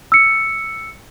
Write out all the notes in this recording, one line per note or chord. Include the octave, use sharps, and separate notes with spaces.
E6 C#7